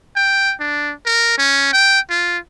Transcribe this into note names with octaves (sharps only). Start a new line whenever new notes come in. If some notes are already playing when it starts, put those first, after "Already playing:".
G5
D4
A#4
C#4
G5
F4